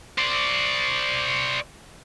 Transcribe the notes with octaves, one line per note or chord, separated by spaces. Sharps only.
C5 D5